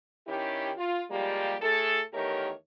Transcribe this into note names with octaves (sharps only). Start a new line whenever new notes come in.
D#3 C#4 E4 G4
F4
F3 G3 G#3 A#3 G4
A2 A3 G#4 A4
E2 D#3 A3 G4 A#4 C#5